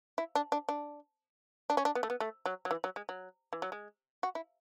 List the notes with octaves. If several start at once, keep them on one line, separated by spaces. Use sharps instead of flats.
E4
D4
D4
D4
D4
C#4
D4
B3
A3
B3
A3
F#3
F#3
E3
F#3
G#3
F#3
E3
F#3
G#3
F#4
E4